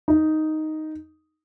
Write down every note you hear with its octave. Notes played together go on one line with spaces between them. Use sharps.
D#4